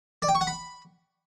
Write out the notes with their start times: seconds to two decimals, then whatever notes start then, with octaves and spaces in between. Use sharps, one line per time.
0.22 D5
0.29 G5
0.35 C#6
0.41 F#5
0.47 B5